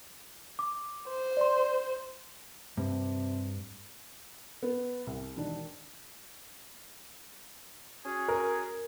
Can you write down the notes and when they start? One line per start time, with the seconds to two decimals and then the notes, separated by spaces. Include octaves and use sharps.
0.59 D6
1.08 C5
1.37 D5 C6
2.77 G2 C3
4.62 B3
5.07 C2
5.36 E1 D#3 D4
8.05 C#4 F#4 G#4
8.28 A#4